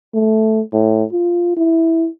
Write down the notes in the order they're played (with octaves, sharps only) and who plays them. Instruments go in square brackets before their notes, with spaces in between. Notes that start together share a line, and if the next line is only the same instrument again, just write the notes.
[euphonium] A3
A2
F4
E4